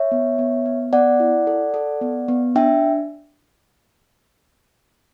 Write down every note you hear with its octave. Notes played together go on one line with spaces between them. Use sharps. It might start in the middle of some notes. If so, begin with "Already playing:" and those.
Already playing: C#5 E5
B3
B3
B3
B3 D5 F#5
E4
A4
A4
B3
B3
D4 E5 G5